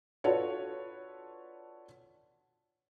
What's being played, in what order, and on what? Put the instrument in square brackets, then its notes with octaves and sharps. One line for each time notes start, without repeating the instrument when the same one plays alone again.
[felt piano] D4 F4 F#4 A4 B4 C#5